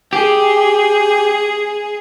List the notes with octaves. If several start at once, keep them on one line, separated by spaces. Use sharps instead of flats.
G4 G#4